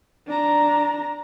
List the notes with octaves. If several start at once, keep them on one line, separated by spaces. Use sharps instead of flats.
D4 A#5